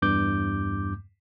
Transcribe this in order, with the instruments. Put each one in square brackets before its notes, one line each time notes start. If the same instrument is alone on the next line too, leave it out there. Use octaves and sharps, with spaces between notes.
[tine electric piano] E2 G2 D6 G6